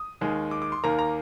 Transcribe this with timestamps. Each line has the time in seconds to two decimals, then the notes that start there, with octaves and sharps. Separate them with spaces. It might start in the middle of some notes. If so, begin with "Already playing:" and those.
Already playing: D#6
0.21 D#2 D#3 G#3
0.51 D6
0.62 D6
0.72 C6
0.84 D#2 D#3 A#3 A#5
0.99 A#5